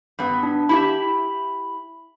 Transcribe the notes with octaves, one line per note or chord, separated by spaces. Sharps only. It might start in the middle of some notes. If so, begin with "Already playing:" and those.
G2 B3
D4
E4 G4 E5 B5